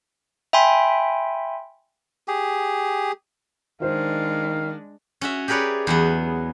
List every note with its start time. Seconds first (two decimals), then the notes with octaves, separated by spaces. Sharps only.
0.53 E5 G5 G#5 B5 C6
2.28 G4 G#4
3.82 D#3 G#3 D4 C5 F5
5.21 C#4 F#4 E5
5.48 G4 G#4 A#4 B4 C#5 D5
5.87 E2 F#3 B3